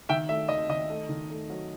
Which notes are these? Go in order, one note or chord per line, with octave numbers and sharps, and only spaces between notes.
D#3 E5 G5
A3 E5
D#2 D#5
D#3 D#5
A3
D#3
A3
F#3